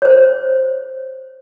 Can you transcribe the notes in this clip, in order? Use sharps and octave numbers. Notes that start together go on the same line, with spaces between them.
C5 C#5